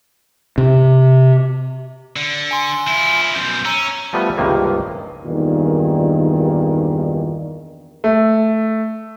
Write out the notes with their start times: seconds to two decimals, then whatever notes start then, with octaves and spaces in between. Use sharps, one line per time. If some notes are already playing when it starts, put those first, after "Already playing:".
0.58 C3
2.16 D3
2.51 G#5 C6
2.87 F3 E4
3.35 F#2 B2 G6
3.65 C#4 A#5 E6
4.13 F3 G3 A3 B3
4.38 C#2 G2 C3 D#3 A#3
5.24 E2 G2 A#2 D#3
8.04 A3